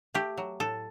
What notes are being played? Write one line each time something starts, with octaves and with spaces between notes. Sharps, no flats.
A3 G4
F#3
A2 A4